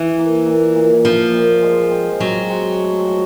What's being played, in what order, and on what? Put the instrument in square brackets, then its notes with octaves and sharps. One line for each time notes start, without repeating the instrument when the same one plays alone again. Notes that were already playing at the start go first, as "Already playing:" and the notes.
Already playing: [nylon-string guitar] E3
[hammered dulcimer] A#3
A#2
A#2
[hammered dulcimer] A#2 [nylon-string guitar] F3
[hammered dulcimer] A#2
G#3
C4
[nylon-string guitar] F#3 [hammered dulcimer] G#3
[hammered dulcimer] C4
A3
F3